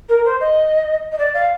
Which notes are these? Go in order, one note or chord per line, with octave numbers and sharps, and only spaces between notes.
A#4
C5
D#5
D#5
D5
F5